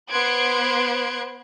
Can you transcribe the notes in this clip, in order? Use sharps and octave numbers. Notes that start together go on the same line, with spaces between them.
B3 C5 C6 F#6 G#6 D7